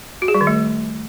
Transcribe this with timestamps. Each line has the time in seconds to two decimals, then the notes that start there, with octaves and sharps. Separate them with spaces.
0.22 F#4
0.28 G#4
0.34 G3
0.41 D#3
0.47 A3